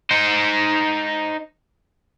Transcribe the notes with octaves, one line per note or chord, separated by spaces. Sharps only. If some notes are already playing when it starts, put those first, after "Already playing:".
D#4 C5